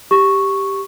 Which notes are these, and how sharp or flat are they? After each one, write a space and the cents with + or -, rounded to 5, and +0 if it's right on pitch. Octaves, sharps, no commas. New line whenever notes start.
G4 +0 C#6 +0